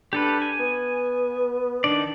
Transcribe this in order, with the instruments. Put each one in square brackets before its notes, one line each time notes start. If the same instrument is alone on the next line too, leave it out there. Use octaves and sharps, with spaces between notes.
[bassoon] D4 [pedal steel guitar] G4 A4 B4
[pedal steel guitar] G#5
[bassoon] B3
[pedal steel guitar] D#3 D5 [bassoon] D4